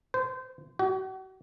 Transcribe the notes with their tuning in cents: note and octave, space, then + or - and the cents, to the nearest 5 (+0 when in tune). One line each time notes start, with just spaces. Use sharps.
C5 -25
F#4 +40